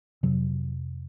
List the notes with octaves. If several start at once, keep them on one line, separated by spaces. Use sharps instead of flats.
F2 C3 F#3